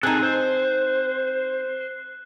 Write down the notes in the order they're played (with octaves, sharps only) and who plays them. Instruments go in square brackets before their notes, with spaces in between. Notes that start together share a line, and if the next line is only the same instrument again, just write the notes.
[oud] C4 D#4 [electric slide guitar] G#4 A4 [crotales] F#6
[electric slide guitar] C5